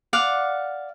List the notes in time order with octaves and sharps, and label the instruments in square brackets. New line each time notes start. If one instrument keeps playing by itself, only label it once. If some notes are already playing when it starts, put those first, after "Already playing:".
[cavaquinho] D5 F5 F#5